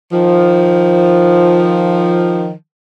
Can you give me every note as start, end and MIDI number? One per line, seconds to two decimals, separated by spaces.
0.12 2.52 51
0.12 2.52 53